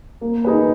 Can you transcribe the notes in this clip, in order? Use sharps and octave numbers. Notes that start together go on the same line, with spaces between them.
A#3
D#4 G#4 B4